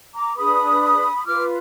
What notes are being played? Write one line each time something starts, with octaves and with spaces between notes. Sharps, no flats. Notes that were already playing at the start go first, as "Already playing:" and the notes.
A#5 D6
D4 G#4 B4 B5 D#6
D#6
F4 B4 D6 F6